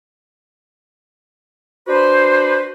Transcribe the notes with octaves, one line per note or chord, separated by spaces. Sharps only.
D4 F#4 B4 C5